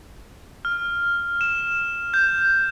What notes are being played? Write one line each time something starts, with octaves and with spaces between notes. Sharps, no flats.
F6
E7
G6